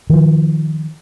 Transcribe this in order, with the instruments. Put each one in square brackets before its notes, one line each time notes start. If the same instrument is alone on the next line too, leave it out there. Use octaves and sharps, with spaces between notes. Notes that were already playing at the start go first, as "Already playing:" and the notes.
[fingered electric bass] D#3 F3